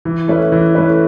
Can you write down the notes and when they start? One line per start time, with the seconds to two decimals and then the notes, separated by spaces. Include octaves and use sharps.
0.05 E3
0.28 A3 C#4 E4 B4
0.52 E3
0.75 A3 C#4 E4 B4